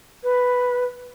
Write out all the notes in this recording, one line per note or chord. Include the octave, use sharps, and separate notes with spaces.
B4